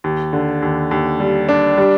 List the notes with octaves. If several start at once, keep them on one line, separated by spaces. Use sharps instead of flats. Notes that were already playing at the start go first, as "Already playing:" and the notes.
D#2
D3
D#2
D#2
G3
D4
G3